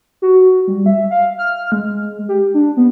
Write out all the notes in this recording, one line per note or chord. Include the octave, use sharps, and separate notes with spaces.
F#4
G3
E5
F5
F6
G#3
G4
D4
B3